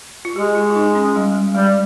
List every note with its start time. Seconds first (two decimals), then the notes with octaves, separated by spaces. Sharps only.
0.25 F4
0.36 G#3 G4
0.55 F4
0.70 F4
0.76 D#4
0.95 C#4
1.16 G3
1.35 G#3
1.55 G3 G#3